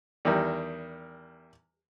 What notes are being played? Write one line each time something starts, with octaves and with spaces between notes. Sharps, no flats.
E2 D#3 G3